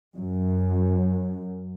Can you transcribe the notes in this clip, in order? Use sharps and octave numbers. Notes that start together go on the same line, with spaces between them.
F#2